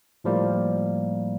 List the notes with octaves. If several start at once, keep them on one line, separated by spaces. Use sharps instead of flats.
A2 F3 G3 A#3